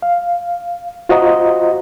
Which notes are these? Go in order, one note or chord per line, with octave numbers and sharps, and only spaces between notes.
F5
F4 F#4 C5 D#5 A#5